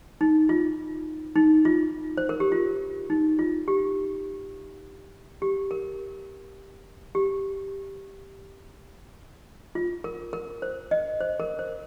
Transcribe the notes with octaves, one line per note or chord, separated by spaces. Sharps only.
D#4
F4
D#4
F4
C5
A#4
G4
F4
D#4
F4
G4
G4
A#4
G4
F4
A#4
A#4
C5
D#5
C5
A#4
C5